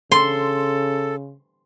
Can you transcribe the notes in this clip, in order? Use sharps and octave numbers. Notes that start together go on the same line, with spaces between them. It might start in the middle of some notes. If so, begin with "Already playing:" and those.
C#3 A4 C6